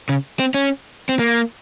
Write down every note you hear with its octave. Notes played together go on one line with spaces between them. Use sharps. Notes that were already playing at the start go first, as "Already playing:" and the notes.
C#3
C4
C#4
C4
A#3